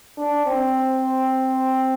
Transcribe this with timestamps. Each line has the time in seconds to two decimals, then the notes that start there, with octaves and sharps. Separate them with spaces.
0.17 D4
0.46 C4